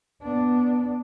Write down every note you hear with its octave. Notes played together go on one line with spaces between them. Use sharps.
B3 D4